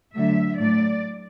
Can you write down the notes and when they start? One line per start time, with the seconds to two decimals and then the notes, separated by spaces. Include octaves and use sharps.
0.15 D3 F#3 A3 E5
0.59 A2 F#3 A3 D5